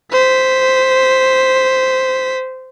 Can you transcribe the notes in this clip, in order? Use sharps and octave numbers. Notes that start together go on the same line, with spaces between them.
C5 B6